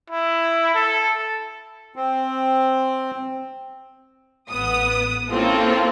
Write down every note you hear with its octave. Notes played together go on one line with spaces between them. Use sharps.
E4
A4
C4
A1 B3 D#6
A#3 C4 C#4 E4 F4 A4